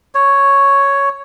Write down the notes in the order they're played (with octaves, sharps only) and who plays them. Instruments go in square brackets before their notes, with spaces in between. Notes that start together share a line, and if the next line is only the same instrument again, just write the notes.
[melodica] C#5